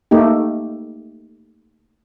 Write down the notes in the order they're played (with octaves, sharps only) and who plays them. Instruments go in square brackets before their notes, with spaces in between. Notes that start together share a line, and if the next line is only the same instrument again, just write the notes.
[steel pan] A3 A#3 D#4 G4